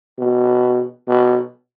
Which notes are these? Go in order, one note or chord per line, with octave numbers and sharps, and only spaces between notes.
B2
B2